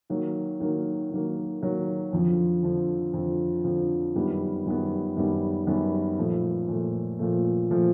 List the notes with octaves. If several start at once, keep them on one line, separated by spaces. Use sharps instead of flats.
D#3 F#3 A#3
D#3 F#3 A#3
D#3 F#3 A#3
D#3 F#3 A#3
F2 D3 F3
F2 D3 F3
F2 D3 F3
F2 D3 F3
F#2 D#3 G3 B3
F#2 D#3 G3 B3
F#2 D#3 G3 B3
F#2 D#3 G3 B3
A#2 F3 A3
A#2 F3 A3
A#2 F3 A3
A#2 F3 A3